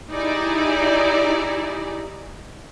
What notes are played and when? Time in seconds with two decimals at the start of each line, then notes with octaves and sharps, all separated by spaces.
0.12 D#4 E4 G4 G#4 D5